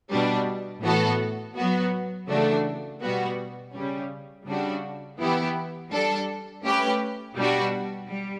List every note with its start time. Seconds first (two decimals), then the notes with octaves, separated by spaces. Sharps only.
0.12 B2 G3 D4
0.83 A2 E3 B3 F#4 A4
1.56 F#3 B3 F#4
2.28 C#3 E3 A3 D4 F#4
3.01 B2 G3 B3 F#4
3.74 C#3 G3 C#4
4.46 C#3 G3 D4 F#4
5.18 E3 B3 E4 G4
5.91 G3 D4 A4
6.64 A3 C#4 G4 B4
7.36 B2 G3 D4 F#4
8.09 G3